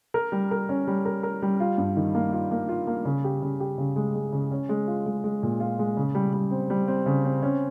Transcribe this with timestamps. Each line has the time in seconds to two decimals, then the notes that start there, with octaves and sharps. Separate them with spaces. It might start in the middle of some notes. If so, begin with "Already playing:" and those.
0.14 A#4
0.32 G3
0.51 A#4
0.69 C#4
0.87 G3
1.05 A#4
1.23 A#4
1.42 G3
1.60 F4
1.78 G2
1.96 D#3
2.15 A#3
2.33 F4
2.51 A#3
2.69 F4
2.87 A#3
3.05 C#3
3.24 G4
3.42 C#3
3.60 G4
3.78 C#3
3.96 G#3
4.15 G#3
4.32 C#3
4.52 C#4
4.69 G#3
4.87 F4
5.06 G#3
5.24 G#3
5.43 A#2
5.60 F4
5.79 G#3
5.97 C#3
6.15 G3
6.33 G3
6.51 C4
6.70 G3
6.88 C4
7.06 C#3
7.25 C4
7.43 C#4